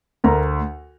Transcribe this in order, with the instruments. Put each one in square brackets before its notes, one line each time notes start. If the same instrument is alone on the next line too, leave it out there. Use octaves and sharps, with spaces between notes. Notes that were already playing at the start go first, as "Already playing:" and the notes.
[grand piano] D2 A#4 A#5